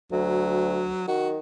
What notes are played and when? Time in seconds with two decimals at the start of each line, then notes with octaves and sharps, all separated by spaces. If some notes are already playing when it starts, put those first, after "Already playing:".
0.12 D2 F#3
1.08 D#3 F#4